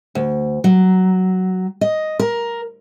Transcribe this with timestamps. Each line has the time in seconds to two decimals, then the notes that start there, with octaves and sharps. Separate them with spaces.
0.15 D2
0.64 F#3
1.81 D#5
2.19 A#4